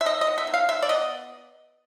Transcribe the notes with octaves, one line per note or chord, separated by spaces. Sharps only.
E5
D#3 D#5
D#5
B3
E5
D#3
F5
D#3 E5
D5
B3 D#5